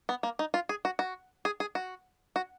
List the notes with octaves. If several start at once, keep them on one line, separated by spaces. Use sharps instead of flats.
B3
A#3
D#4
F4
G#4
F#4
F#4
G#4
G#4
F#4
F#4